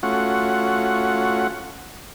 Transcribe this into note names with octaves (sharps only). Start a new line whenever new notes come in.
A3 C#4 F4 F#4 F#5